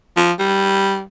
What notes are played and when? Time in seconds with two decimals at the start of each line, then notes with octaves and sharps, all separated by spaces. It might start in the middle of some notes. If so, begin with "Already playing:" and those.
0.17 F3
0.39 G3